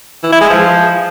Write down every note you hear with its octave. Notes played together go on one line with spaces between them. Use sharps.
E3
E4
G#3
F3